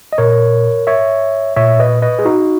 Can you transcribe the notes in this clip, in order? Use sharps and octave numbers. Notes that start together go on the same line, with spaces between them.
D#5
A#2 A#4 C#5
C#5 E5
A#2 C#5 E5
B4 D#5
B4 D#5
G#4
D#4 F#4